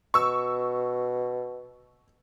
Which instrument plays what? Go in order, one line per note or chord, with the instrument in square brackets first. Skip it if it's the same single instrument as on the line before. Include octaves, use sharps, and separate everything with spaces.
[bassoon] B2 [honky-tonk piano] C#6 E6